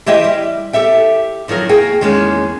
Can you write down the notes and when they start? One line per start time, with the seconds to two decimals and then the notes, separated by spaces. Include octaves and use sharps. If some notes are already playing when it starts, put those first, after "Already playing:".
0.06 E3 G4 C5 D#5 E5 G5
0.24 G3
0.73 G4 A4 E5 G5
1.48 D#3 F3 F#3 A#4
1.69 A#3 F#4 G#4 G5
2.01 E2 D#3 G#3 A#3 C#4